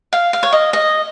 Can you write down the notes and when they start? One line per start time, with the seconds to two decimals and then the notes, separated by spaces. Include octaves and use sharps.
0.13 F5
0.33 F5
0.43 C#5
0.53 D#5
0.73 D#5